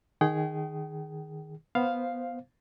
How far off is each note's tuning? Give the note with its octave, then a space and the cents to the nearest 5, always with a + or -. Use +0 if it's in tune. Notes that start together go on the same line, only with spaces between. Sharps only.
D#3 +0 G#4 +0 G5 -40
B3 +0 C5 +0 F5 +0